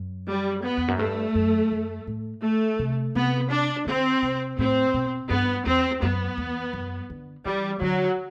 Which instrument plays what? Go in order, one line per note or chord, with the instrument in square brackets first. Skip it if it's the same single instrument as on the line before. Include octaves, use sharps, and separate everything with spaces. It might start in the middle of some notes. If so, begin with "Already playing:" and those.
Already playing: [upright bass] F#2
[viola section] G3
B3
[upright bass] E2
F#2
[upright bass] G2 [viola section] A3
[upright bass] F#2
F#2
A2
[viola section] A3
[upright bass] C3
[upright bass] C3 [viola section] B3
[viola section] D4
[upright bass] D3 [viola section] C4
[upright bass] C3
[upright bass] A2 [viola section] C4
[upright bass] B2
[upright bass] G2 [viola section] B3
[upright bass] E2 [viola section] C4
[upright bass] F#2 [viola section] B3
[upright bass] E2
F#2
D3
[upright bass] E3 [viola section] G3
[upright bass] D3 [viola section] F#3